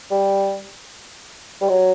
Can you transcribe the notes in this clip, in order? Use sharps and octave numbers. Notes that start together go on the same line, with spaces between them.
G3
G3
F#3